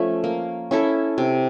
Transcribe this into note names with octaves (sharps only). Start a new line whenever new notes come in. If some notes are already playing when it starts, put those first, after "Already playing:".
Already playing: F3 A3 C#4
A#3
C#4 E4 A4
C3